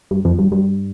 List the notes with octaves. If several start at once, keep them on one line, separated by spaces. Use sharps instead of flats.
G2
F2
G2
G2